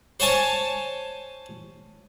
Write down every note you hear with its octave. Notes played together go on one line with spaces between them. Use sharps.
C5 C#5 G#5 A5